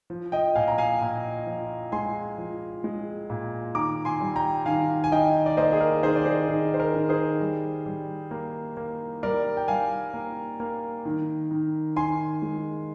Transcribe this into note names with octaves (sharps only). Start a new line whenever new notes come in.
F3
D#5 G5
A#2 F5 G#5
A#5
F5 G#5
A#2
F3
G#3 G#5 C6
F3
G#3
A#2
D#3 A#5 D6
G#5 C6
G3
G5 A#5
D#3 F5 G#5
G#5
D#3 D#5 G5
D5
A#3 C5 D#5
G#4
A#4
D#3 G#4 C5
D5
G#4 C5
D#3 G#4
C5
A#4
D#3
G#4 C5
G3
G3
A#3
A#3
G3 A#4 D5
G5
G3 F5 G#5
A#3
A#3
D#3
D#3
D#3 G#5 C6
G#3